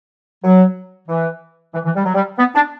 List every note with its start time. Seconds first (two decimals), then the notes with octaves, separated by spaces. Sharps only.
0.44 F#3
1.08 E3
1.74 E3
1.85 E3
1.96 G3
2.05 F#3
2.14 G3
2.38 B3
2.55 D4